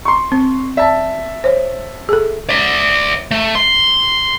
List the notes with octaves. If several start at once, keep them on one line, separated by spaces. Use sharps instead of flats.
C6 C#6
C4
D5 E5 A5
C5 C#5
G#4 A4
D5 E5
A3
C6